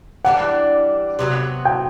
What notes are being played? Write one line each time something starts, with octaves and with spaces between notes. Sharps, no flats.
E3 G3 D4 F#5
C3 F#3 B3
G5